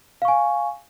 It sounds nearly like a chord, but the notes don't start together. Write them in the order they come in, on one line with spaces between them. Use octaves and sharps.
F5 C#6 G#5